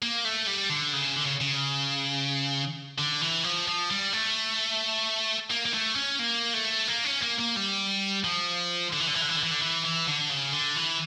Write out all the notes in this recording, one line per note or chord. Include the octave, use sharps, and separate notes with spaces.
A#3
A3
G3
D3
C#3
D3
C#3
C#3
D3
E3
F3
F3
G3
A3
A#3
A#3
A3
C#4
A#3
A3
A#3
C#4
A#3
A#3
G3
F3
D3
E3
D3
E3
D3
E3
D3
E3
D3
E3
E3
D3
C#3
D3
E3